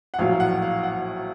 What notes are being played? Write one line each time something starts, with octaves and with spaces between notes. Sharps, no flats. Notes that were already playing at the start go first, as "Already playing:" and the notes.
F#5
A#1 A2 F#3 F5
F#5
F5
F#5